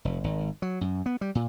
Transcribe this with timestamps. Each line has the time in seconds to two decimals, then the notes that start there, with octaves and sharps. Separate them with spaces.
0.05 F1
0.24 G#1
0.62 F#3
0.81 F#2
1.06 B3
1.21 G3
1.35 A#2